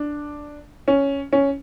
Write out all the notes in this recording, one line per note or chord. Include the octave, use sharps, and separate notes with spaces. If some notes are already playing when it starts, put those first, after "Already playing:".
Already playing: D4
C#4
C#4